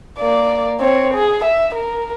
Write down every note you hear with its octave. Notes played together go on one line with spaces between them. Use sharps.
A#3 D5
C4 C#5
G#4
E5
A#4